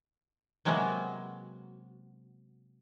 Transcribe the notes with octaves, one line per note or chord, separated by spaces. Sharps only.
C3 F#3 G#3 A#3 B3 F#4